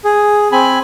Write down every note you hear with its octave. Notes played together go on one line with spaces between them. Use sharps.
G#4
C4 G#5 B5